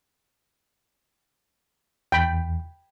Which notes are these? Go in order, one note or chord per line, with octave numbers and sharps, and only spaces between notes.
E2 G5 B5